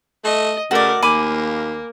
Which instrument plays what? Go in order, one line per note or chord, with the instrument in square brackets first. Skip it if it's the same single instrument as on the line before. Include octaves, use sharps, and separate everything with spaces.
[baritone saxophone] A3 [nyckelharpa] D#5
[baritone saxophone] C#3 [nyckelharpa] A3 A#4 [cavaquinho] F#4 D5
[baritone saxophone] D#2 [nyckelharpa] A#3 [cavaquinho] G#5 B5 D6